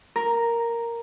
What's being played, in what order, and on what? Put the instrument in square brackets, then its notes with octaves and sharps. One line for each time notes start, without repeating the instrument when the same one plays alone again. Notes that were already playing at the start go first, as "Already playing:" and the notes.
[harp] A#4